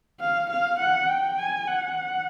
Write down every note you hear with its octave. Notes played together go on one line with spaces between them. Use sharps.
F5
F5
F#5
G5
G#5
F#5